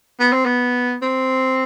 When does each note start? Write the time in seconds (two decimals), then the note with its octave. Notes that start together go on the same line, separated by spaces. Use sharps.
0.20 B3
0.33 C4
0.46 B3
1.02 C4